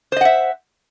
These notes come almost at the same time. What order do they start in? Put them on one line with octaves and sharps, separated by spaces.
C5 D#5 F#5 E5